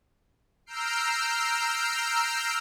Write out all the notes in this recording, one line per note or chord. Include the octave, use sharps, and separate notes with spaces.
A#5 E6 F6 G6 C7 D7